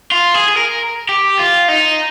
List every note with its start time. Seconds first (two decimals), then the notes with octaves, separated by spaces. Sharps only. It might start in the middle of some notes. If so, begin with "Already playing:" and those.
0.11 F4
0.34 G#4
0.48 G#4
0.57 A#4
1.09 G4
1.39 F4
1.68 D#4